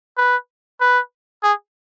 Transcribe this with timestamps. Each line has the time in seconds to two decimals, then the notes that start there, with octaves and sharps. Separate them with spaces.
0.18 B4
0.81 B4
1.43 G#4